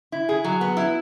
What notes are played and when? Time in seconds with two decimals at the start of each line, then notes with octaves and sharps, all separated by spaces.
0.12 E4
0.29 G#4
0.44 F#3
0.61 B3
0.77 E4